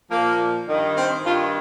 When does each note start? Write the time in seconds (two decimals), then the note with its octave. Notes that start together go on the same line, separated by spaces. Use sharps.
0.10 A#2 F3 A#3
0.67 G2 D#3
0.96 C4
1.24 G2 D#3 F4